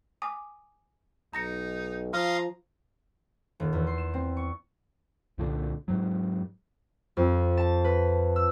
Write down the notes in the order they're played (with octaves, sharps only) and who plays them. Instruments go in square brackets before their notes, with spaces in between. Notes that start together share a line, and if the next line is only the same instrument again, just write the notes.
[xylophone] G#5 D6 D#6
[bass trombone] B1 [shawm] D#4 [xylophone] A#5 A#6 C#7
[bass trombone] F3 [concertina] F5 C6 D#6 [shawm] A#5 [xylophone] F6
[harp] D#1
E2
C6
E7
C4
C#6
[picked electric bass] C2 A#2 D3
G#2 F#3
[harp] F2
A5
B4
E6